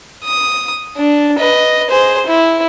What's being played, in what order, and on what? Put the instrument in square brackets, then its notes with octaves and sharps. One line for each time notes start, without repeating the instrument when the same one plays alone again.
[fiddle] D#6
D4
B4 D#5
G#4 C5
E4